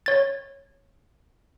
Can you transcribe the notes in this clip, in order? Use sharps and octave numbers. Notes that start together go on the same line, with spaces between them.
C#5 A6